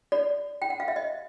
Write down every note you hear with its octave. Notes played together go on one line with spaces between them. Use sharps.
D5
G5
F#5
F5
E5
D#5